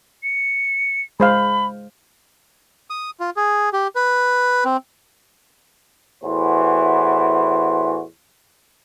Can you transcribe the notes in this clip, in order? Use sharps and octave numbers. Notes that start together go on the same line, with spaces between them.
C#7
G#3 C5 F5 B5
D#6
F4
G#4
G4
B4
C4
E2 A2 E3 F#4 C5